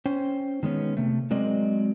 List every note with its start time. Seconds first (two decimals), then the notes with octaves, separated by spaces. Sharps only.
0.06 C#4 C5 G5
0.63 D#3 G#3 B3 C#4
0.97 C3 A3
1.31 F#3 G#3 C4 A#4 D5 D#5